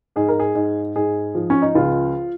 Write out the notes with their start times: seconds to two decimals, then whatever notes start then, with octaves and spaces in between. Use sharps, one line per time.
0.16 G#2 G#4
0.28 A#4
0.40 G#4
0.55 G#2
0.95 G#2 G#4
1.35 F3
1.50 C#4
1.62 D#4
1.75 C#2 F4